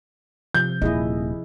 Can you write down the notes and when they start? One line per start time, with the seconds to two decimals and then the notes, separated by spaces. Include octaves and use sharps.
0.54 C3 F3 G6
0.82 D#1 E4 G#4 D#5